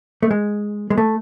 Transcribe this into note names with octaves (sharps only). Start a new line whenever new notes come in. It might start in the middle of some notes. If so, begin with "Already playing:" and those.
A3
G#3
G#3
A3